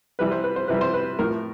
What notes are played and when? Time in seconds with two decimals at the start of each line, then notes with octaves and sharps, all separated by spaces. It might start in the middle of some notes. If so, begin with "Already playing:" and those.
0.19 C3 E3 G3 B4
0.32 C5
0.44 B4
0.56 C5
0.68 C3 E3 G3 B4
0.81 C5
0.94 B4
1.19 A2 F3 A#4